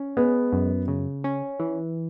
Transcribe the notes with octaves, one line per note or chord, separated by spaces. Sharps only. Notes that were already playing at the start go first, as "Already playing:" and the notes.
Already playing: C#4
G#3 B3
F#2
C#3
C#4
E3